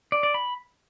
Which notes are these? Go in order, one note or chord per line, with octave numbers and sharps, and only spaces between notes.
D5
D5
B5